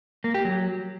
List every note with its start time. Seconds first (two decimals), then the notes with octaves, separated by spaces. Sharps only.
0.24 A#3
0.34 G4
0.45 F#3